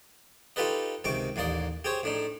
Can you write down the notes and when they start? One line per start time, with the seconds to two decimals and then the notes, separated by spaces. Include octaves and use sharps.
0.56 D#4 F4 G4 A4 B4 D#5
1.04 C#2 C3 D#3 C#6 D6
1.36 A1 D#2 A#3 D5 D#5
1.84 G4 G#4 C5 C#5
2.03 A2 D4 D#4